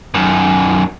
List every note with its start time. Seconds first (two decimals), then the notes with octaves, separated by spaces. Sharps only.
0.14 F#2 D#3